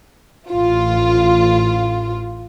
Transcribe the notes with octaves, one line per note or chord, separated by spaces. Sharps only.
A1 F4